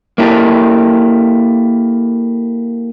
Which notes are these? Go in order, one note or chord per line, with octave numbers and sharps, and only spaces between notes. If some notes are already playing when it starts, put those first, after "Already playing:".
A#3 E4 G4 A4